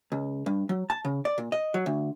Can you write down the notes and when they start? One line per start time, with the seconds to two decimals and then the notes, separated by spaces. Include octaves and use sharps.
0.12 C#2
0.46 G2
0.69 F#3
0.90 A5
1.05 C#3
1.25 D5
1.38 A#2
1.52 D#5
1.74 F#3
1.86 D2